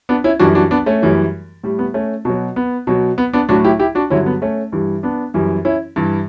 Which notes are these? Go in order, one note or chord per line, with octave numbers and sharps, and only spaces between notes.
B3 D4
C#4 E4
F#2 E3 G3 D4 F#4
D4 F#4
B3 D4
A3 C#4
F#2 E3 G3
A2 G3
B3
A3 C#4
B2 F#3
B3
B2 F#3
B3
B3 D4
A2 F#3 D4 F#4
E4 G4
E4 G4
D4 F#4
G2 D3 F#3 C#4 E4
B3
A3 C#4
G2 E3 G3
B3 D4
F#2 E3 G3
C#4 E4
G2 E3 G3